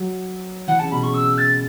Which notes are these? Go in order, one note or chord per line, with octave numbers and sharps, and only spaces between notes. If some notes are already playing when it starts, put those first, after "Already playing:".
Already playing: F#3
E3 F#5
C#3 A5
B2 B5
C#3 C#6
E6
A6